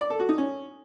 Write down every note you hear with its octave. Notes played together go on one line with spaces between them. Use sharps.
D5
A4
F#4
D#4
C#4